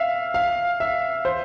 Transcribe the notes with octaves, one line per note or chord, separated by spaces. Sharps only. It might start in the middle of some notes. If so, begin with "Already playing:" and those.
Already playing: E5 F5
F5
E5
C5